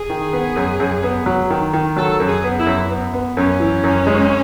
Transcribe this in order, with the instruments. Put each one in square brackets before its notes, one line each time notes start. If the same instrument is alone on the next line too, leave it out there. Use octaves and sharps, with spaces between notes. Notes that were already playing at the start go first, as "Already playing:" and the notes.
Already playing: [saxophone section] G#4
[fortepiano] D#3
B3
F#2
F#2
B3
F#3
D#3
D#3
[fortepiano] F#3 [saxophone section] A4
[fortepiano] F#2
[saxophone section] G#4
[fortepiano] B3
[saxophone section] E4
[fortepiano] F#2
B3
B3
[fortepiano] F#2 [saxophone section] C#4
[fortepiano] E3
F#2
G#3